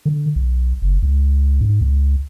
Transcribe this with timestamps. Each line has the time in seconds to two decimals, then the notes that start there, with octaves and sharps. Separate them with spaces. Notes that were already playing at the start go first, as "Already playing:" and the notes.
0.06 D3
0.36 B1
0.82 F#1
1.02 C#2
1.61 G#2
1.81 C#2